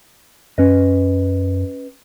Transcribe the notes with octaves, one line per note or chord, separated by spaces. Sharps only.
F#2 C#4 B4 D#5